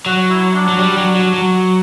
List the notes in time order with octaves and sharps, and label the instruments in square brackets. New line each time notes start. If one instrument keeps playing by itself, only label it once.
[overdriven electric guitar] F#3 [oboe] F#4
[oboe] E4
D4
[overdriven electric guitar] F#3
G3
F#3
F#3
F#3